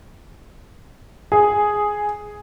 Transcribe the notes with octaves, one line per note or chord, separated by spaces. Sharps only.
G#4